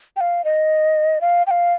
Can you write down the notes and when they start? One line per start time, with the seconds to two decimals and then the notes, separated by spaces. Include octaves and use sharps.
0.16 G5
0.21 F5
0.44 D#5
1.21 F5
1.47 G5
1.51 F5